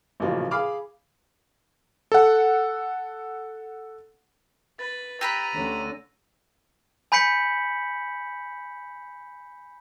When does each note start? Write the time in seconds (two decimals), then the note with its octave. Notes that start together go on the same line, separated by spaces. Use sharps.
0.20 A1 A#2 C#3 F3 F#3
0.51 G#4 F5 B5 D6 F6
2.12 A4 F#5
4.79 B4 A6
5.21 G4 B4 A#5 B5 E6 A#6 D#7
5.55 D2 D3 C#4 D#7
7.12 G#5 B5 G6 B6 C#7 F#7